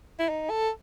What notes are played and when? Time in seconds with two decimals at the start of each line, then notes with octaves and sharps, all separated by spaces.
0.19 E4
0.29 D#4
0.50 A4